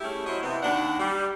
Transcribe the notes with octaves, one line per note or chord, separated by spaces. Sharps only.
G3 A3 C#4 E4 G4 G#4
F#3 E4 C5 C#5 D#5
C3 E3 B3
D#2 D4 F#5
G3